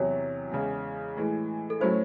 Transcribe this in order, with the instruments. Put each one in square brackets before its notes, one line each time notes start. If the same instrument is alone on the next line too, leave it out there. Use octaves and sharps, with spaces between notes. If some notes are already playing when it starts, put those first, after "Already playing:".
Already playing: [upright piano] E2 C3 F#3 [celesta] C#5
[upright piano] E2 C#3 G#3
A2 E3 G#3
[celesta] A4
[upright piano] A2 F#3 A3 C#4 E4 [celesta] C5